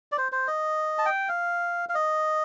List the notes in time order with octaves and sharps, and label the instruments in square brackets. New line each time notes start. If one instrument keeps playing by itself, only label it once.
[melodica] D5
C5
C5
D#5
A5
G5
F5
F5
D#5